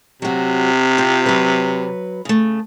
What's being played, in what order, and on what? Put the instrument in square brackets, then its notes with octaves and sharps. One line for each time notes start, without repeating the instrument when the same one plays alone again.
[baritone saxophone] C3 [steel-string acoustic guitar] F#3 F#4
[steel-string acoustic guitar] C4 F4
F#3 B4
C#3 A3